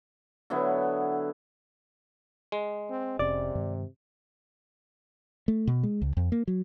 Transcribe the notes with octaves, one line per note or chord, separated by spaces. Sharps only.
D3 F#3 B3 E4
G#3
C4
F1 C3 C#4 D5
G2 D#3 G#3
A3
B2
G#3
C#2
F2
A#3
F#3